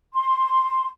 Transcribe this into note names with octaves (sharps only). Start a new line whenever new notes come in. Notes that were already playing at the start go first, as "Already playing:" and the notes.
C6